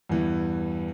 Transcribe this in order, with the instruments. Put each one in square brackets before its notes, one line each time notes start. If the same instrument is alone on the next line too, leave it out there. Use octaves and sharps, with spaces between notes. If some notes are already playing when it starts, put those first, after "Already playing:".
[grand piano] E2 G2 E3